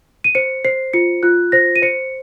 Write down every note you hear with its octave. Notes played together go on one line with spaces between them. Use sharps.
D#7
C5 C#7
C5 C7
F4 C#7
F4 F#6
C5 A#6
D#7
C5 C#7